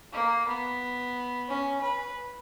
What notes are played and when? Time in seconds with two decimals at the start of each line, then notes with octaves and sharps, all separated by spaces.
0.13 A#3
0.47 B3
1.48 C#4
1.81 B4